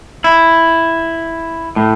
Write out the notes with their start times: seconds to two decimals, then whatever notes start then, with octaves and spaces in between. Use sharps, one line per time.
0.24 E4
1.76 A2